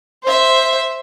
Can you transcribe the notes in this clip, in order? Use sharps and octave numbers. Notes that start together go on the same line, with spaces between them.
C5 E5